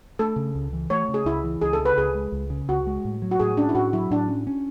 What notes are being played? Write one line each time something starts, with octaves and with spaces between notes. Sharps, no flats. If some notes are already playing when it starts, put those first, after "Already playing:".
A3 A4
C#3
C#2
E3
A3 C#5
C#3
G#4
C#2 E4
E3
C#2 G#4
A4
C#3
B4
C#2 G#4
G#3
C#2
C#3
C#2 F#4
G#3
A2
F#3
F#4
A2 G#4
C#4 D4
E4
A2 F#4
F#3 E4
A2 D4
C#4
C#4